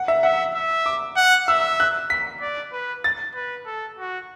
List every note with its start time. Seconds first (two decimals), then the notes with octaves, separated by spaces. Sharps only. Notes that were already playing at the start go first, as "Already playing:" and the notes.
Already playing: F#5
0.08 E5
0.23 E5 F#5
0.55 E5
0.86 D6
1.17 F#5
1.48 E5 E6
1.80 F#6
2.10 B6
2.41 D5
2.72 B4
3.04 A6
3.35 B4
3.66 A4
3.98 F#4